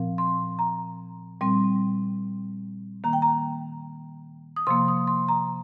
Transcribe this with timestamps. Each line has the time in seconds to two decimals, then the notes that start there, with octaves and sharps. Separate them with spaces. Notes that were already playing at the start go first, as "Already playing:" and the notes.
Already playing: A#2 F3 C4
0.18 C6
0.59 A#5
1.41 A#2 G3 C4 C6
3.04 D#3 A#3 A#5
3.13 G5
3.22 A#5
4.56 D#6
4.67 C3 F3 A#3 C6
4.88 D#6
5.07 C6
5.28 A#5